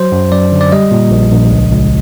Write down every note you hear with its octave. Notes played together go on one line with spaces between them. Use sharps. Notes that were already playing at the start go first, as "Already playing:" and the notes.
Already playing: F#3 C5
F#2
F#2 D5
D3
D5
G3 D#5
A#2
A#1
A#1
C#2
C#2